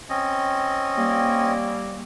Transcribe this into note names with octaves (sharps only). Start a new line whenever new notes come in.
C4 C#4 D#5
G3 A#3